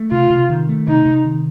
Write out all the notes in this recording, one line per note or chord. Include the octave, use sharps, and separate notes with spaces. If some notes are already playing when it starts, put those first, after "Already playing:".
Already playing: A3
C3 F4
C3
D#3
A3
C3 D#4
C3
D#3